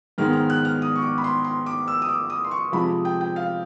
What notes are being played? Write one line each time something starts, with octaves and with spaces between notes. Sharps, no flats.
G#2 D#3 G#3 B3 F6
F6
F#6
F6
D#6
C#6
D6
B5
C6
C6
D6
E6
D#6
D6
D#6
C6
C#6
C3 F3 G#3 B5
G5
G5
F5